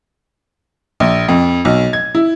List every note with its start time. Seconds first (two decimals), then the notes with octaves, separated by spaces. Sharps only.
1.00 A#1
1.28 F2
1.65 B1
1.93 G#6
2.15 E4